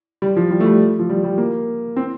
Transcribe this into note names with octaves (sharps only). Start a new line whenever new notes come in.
G3
F3
G3
A3
G3
F3
G3
G3
A#3
C4